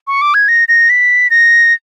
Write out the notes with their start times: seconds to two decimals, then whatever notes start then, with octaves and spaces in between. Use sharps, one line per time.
0.07 C#6
0.21 D6
0.34 G#6
0.48 A#6
0.68 A#6
0.90 B6
1.30 A#6